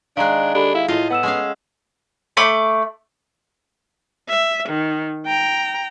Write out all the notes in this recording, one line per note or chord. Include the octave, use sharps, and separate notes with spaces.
D#3 G#3 D4 F5 A#5 F#6
D4 G4 A4 B5
E4 F5
A2 E4 F4 D#5
B3 F#5 E6 E7
G#3 C#4 F5
A3 B5 D6
E5
D#3
G5 A#5